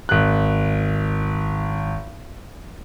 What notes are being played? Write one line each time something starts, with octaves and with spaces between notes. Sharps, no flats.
G#1 F#6